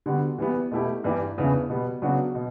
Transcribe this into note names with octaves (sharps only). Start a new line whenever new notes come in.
D3 G3 B3 F#4
E3 G3 B3
B2 A3 E4 G4
G2 E3 G3 D4 G4
E2 C#3 E3 B3 D4
B2 G3 B3
C#3 F#3 B3 D4 F#4
B2